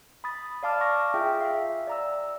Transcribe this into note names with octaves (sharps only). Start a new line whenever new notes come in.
B5 D#6 A6
D5 F5 A5 D6 F6
C#6 D6 F6 A#6
F4 G#4 E5 G5
E5 F5
D5 A#5 E6